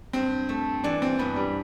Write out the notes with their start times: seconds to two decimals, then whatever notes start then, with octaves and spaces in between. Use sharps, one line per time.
0.13 G2 C4
0.49 A3
0.84 E3 D4
1.02 C4
1.19 G2 B3
1.36 G3